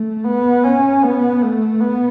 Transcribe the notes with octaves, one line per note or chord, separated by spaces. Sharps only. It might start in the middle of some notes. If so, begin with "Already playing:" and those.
Already playing: A3
B3
C#4
B3
A3
B3